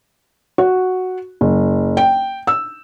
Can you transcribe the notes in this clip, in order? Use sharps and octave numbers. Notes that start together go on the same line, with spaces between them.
F#4
F#1
G5
E6